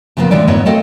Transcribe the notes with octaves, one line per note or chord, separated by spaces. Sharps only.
A#2 C#3 F3 A#3 B3
A2 D3 E3 G#3 E4 D5
G#2 B3 E4 B4 C#5 D#5
A3 C4 A4 D#5 F5